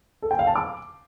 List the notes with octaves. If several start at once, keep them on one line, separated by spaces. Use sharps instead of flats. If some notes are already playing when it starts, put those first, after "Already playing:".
A4
G5
F5
A5
D6